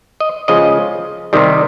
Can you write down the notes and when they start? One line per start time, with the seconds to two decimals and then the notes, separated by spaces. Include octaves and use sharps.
0.20 D#5
0.48 C#3 F3 G#3 D#5
1.33 C3 D#3 G3